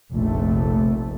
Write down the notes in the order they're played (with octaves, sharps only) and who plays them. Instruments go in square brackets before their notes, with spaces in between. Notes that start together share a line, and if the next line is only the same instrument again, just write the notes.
[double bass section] F1 A#1 A3